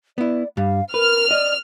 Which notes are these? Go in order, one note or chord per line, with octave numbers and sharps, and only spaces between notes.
B3 E4 D5
G2 G3 F5
A#4 B4 F6
D5 D#5